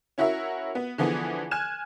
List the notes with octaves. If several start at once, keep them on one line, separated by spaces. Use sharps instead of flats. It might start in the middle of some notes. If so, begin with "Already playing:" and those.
C#4 E4 F#4 A#4 E5
B3
D3 E3 F3 B3 G#4
G#5 F6 F#6 G#6 E7